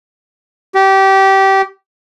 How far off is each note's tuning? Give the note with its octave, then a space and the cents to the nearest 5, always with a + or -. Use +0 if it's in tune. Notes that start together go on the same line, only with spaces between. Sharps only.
G4 -20